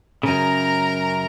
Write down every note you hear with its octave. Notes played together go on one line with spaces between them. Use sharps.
F#2 C#3 A#4 A#5